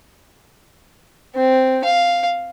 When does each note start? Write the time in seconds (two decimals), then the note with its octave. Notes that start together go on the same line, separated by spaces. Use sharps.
1.36 C4
1.84 F5